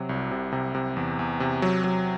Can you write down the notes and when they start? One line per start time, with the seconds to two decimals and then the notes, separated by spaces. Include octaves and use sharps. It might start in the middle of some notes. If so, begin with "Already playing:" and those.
Already playing: C3 F#3
0.09 C2
0.31 C3
0.52 C3
0.75 C3
0.97 E2
1.19 E2
1.40 C3
1.62 F#3
1.84 F#3